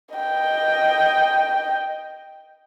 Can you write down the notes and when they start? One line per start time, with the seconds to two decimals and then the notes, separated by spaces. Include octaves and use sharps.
0.15 D#5 G5